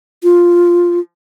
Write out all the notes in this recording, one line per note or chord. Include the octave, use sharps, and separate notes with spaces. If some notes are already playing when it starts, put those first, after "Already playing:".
F4